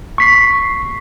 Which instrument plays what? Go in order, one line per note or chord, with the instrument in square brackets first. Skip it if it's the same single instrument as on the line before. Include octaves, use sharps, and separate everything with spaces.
[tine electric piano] C#6 B6 C7